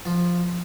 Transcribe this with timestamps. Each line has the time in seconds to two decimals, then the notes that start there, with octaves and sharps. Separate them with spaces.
0.06 F3